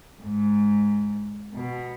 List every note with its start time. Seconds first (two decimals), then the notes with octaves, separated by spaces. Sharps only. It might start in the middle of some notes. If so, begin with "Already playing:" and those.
0.21 G#2
1.54 B2